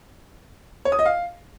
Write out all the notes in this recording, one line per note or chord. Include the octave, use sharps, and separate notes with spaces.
C#5
D#6
D#5
F5